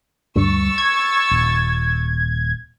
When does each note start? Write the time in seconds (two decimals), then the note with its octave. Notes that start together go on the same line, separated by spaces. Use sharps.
0.36 D2 G2 C#6 E6 A6
0.78 G#6
1.31 D#1